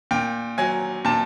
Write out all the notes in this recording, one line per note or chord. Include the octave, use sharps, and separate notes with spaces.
A#2 G5
F#3 G#5
A#2 A5